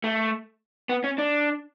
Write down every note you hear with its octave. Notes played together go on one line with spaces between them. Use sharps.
A3
B3
C#4
D4